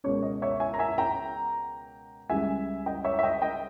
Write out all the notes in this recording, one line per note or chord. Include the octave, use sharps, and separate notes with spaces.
C#2 B2 A#3 C#4 C#5
D#5
C#5 E5
E5 G#5
A#5
E5 G#5
G5 A#5
C#2 C#3 G3 E5 G#5
D#5 G5
C#5 E5
E5
D#5 G5
D#5 G5